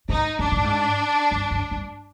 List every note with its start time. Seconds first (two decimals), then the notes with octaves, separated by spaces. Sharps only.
0.09 G#2 D#4
0.39 G#2 D4
0.52 A2
0.64 G#2
1.31 G2
1.51 F#2
1.71 G2